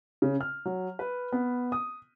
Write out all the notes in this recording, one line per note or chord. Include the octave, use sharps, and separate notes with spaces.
C#3
F6
F#3
B4
B3
D#6